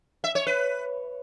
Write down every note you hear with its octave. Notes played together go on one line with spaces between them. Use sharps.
E5
C#5
B4